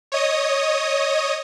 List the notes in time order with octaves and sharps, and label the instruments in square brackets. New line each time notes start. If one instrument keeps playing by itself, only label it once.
[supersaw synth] C#5 D#5 D#6